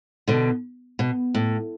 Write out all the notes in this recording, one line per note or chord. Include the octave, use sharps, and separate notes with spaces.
B2 D3
B2
A2